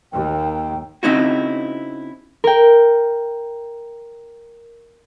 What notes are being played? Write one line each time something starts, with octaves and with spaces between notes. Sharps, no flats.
D#2 G5
C#3 C4 D#4 E4 F#4
A#4 G5